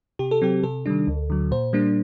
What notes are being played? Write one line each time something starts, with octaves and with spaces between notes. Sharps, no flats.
C3 G4
A4
F#3 C4 G4
C3 A4
D#3 G3 D4
D2
D3 F#3
A#2 C5
G3 A#3 D4